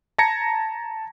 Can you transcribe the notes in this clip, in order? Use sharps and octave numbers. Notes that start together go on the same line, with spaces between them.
A5 A#5 G#6 A#6 C#7